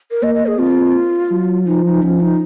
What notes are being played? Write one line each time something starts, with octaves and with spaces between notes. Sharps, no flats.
A#4
A#3 D#5
D#5
G#4
C4 F4
F#3
F3 D#4
D#4
F3 C#4
D#4